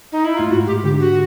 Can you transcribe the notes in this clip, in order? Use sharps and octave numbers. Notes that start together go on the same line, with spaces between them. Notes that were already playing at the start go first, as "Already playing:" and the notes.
D#4
E4
A2 F4
G#2 F#4
G4
D3 G4
F#4